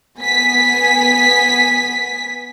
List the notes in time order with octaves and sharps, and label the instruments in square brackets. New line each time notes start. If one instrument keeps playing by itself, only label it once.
[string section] B3 G#5 B6